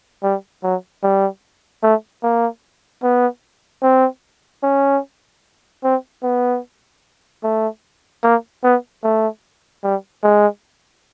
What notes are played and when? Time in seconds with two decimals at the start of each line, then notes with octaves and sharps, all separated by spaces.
0.23 G3
0.63 F#3
1.03 G3
1.83 A3
2.23 A#3
3.03 B3
3.83 C4
4.63 C#4
5.84 C4
6.23 B3
7.44 A3
8.24 A#3
8.64 B3
9.04 A3
9.84 G3
10.23 G#3